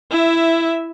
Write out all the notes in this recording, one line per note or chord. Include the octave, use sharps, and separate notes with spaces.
E4 E5